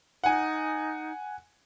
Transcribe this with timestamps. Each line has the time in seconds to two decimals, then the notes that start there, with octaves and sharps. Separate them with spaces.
0.24 D#4 F#5 G#5